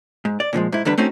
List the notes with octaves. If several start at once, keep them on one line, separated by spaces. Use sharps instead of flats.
G#2
D5
A#2 D3 F3 G#3
G#2 E4
E2 D3 G3 D4 B4
A3 C4 C#4 D#4 F#4